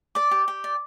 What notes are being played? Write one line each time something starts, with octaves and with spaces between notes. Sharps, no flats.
D5 D6
G4
G4
D5